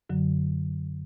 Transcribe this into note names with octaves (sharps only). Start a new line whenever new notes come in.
F#2 D3 F#3